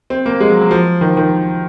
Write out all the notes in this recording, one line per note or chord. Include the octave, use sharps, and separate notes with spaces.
C4
A#3
G#3
F#3
F#3
F3
D#3
F3
D#3